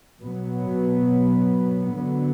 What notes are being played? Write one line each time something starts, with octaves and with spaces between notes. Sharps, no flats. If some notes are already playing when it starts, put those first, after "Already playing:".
B2 F#3 B3
D3 F#3 B3